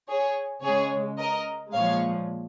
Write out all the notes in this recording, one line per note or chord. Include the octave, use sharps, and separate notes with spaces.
G#4 C#5
C#3 G#3 G#4 C#5
A#4 D#5
A#2 F3 G#3 C#5 F5